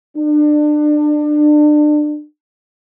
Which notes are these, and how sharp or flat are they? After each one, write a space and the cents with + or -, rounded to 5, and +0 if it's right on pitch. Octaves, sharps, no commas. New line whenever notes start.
D4 +30